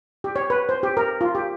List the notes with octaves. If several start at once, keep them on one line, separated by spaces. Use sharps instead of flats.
G4
C#5
B4
C5
G4
A#4
F4
G4